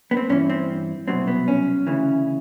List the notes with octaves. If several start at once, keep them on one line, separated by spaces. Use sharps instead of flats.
B3
C4
G2 E3 C#4
C4
C2 B2 F#3 C4
B3
C#4
D2 C#3 E3